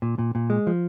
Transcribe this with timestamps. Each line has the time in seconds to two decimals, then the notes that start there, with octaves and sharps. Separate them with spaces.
0.02 A#2
0.19 A#2
0.35 A#2
0.50 G#3
0.67 F3